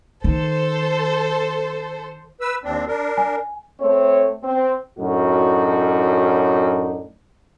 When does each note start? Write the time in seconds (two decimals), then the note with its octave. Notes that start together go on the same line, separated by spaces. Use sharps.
0.24 D#3 A4 C5
2.41 B4 E6
2.64 D#2 C4 D4
2.87 D4 A#4
3.18 G#5
3.80 A3 C4 C#5
4.43 C4
4.99 F#2 A2 D4 D#4 F#4